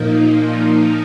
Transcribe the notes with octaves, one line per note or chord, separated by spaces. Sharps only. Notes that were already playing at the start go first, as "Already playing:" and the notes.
Already playing: A#2 F3 A#3 D#4